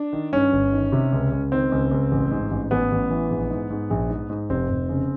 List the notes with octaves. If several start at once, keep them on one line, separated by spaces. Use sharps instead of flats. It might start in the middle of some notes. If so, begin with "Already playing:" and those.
Already playing: D4
D#3
G2 C#4
G1
D#3
C3
C#2
C#2
D#3 C4
C#2
C#2
A1
G#2
A1
A1 B3
A1
E3
A#1
G#2
G#2
A#1
G#2
G#2
F1 C4
F1
C#3